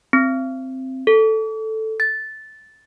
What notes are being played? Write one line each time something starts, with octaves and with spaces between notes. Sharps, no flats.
C4
A4
A6